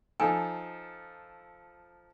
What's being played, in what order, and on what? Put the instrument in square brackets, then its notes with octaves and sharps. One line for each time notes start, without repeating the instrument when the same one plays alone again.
[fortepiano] F3 D#4 A4 [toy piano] G#5